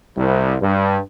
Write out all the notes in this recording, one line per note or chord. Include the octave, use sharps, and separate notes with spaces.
C2
G2